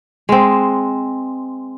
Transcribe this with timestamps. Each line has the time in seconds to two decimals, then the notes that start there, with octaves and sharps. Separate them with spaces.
0.29 G#3 C4